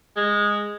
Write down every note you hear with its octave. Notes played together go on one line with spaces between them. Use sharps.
G#3